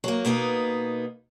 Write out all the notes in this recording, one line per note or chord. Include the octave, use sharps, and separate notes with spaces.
F#3 A#3
B2 A#3 B3 D#4